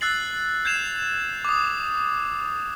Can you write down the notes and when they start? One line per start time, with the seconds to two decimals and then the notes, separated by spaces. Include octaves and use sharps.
0.01 E6 F#6 A6 C7 F#7
0.65 G6 G#6 C7 E7 F7
1.45 D6 D#6